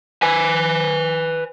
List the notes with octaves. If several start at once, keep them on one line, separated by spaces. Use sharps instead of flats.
B4 G#5